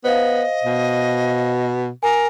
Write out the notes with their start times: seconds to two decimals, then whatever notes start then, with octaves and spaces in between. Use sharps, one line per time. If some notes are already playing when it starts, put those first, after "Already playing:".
0.04 B3 C5 D#5 F5
0.64 B2
2.03 A#4 G#5